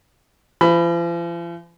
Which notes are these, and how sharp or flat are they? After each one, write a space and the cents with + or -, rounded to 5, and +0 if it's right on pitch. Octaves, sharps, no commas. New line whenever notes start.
F3 -45 B5 +10